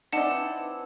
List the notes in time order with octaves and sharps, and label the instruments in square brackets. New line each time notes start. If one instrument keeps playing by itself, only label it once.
[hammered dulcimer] E3 C4 D5 [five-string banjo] D4 D#4 [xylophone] F#5 A5